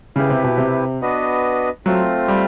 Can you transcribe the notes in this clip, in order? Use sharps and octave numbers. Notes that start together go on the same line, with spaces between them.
C#3 E4 G4 B4
C3
B2
C3
B3 D4 F#4 B4 D#5
F#3 A3 C4 F4
G3